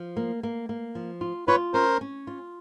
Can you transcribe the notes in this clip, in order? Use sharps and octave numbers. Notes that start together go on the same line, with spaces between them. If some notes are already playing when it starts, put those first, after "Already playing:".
Already playing: F3
A#3
A#3
A#3
F3
F4
F4 B4 C#5
C#4 A#4 C5
C#4
F4